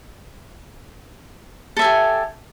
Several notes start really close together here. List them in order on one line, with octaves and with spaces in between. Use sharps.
A4 E5 G#5 G4